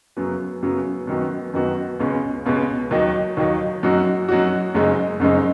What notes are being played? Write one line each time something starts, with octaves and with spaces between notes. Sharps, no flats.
F#2 C#3 F#3 B3
F#2 C#3 F#3 B3
F#2 D#3 B3 F#4
F#2 D#3 B3 F#4
C#2 B2 G#3 C#4
C#2 B2 G#3 C#4
D#2 D#3 F#3 D#4
D#2 D#3 F#3 D#4
F#2 F#3 D#4 F#4
F#2 F#3 D#4 F#4
F#1 F#2 C#3 G#3 D#4
F#1 F#2 C#3 G#3 D#4